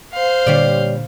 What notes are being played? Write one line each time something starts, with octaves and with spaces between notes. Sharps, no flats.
C5 F5
A#2 D3 G3 C#5 D5